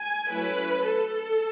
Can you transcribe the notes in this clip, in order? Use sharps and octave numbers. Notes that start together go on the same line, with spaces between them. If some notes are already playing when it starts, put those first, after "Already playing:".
Already playing: G#5
F#3 A3 C#4 E4 B4
A4